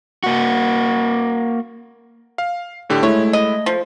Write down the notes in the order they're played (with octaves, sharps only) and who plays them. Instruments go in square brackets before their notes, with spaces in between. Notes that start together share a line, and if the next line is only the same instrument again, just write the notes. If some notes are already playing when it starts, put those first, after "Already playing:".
[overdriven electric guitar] A#3 F#4
[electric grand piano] F5
A2 D3 G4
[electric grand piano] G#3 E4 [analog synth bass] A3 [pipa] C#5
[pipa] D#5
F3